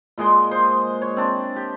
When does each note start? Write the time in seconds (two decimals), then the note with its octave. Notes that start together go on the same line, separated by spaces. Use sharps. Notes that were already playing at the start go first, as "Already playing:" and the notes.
0.18 A#2 G#3 D#5 C6
0.51 C5
1.02 C#5
1.17 C4 D4
1.56 G4